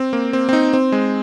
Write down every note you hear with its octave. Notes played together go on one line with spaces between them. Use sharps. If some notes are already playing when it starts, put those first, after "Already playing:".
Already playing: C4
A#3
C4
C4
D#4
C4
G#3